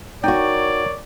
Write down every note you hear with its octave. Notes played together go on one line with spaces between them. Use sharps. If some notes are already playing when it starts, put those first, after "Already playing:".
D#4 F#4 A#4 C#5 D5 G5